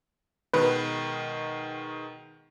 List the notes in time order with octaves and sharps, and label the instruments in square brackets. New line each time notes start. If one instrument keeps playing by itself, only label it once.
[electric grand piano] B2 D#3 G#3 [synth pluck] B4